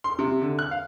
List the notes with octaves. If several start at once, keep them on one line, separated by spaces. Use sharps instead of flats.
C6
C3
D3
F#6
F5